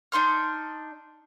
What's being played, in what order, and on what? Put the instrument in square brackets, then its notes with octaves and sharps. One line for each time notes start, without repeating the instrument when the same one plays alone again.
[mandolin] D4 D#4 C6 F6